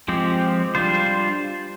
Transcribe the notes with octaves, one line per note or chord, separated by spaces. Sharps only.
F3 G#3 C4 G4
G3 D4 F4 C5